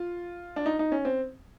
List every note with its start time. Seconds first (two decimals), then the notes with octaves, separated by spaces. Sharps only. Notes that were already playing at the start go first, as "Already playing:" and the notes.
Already playing: F4
0.56 D4
0.66 D#4
0.79 D#4
0.92 C#4
1.05 C4